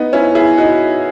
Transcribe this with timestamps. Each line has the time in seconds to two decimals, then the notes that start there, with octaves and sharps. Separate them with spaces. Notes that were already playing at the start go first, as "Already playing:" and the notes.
Already playing: B3 D#4
0.13 C#4 E4
0.35 E4 G#4
0.57 D#4 F#4